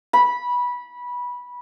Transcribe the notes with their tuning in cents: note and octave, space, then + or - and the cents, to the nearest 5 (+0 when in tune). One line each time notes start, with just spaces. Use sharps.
B5 -15